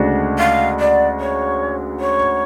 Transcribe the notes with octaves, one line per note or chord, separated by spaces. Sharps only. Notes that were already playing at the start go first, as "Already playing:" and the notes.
Already playing: D2 C#3 G#3 D4 F#4
F5
D5
C#5
C#5